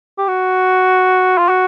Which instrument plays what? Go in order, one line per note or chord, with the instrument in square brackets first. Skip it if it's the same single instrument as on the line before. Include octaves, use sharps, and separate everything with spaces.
[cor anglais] G4
F#4
F4
F#4